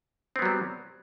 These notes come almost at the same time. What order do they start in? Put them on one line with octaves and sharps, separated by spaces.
C4 B3 F#3 G3